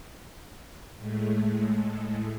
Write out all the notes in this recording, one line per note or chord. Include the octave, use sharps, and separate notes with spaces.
A2 G#3 A3